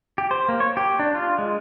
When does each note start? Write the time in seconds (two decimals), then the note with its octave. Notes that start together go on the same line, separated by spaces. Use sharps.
0.18 G4
0.31 C5
0.49 A#3
0.60 C#5
0.77 G4
0.99 D4
1.15 F4
1.38 G#3